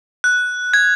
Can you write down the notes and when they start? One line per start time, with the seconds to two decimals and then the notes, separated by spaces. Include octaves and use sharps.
0.24 F#6
0.74 G#6